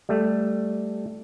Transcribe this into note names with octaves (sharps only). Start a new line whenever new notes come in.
G3 A3